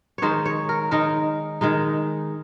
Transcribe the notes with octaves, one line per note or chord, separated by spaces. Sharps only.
D#3 G#3 D#4 C5 C#5
C#5
A#4
D#3 G#3 D#4 A#4
D#3 G#3 D#4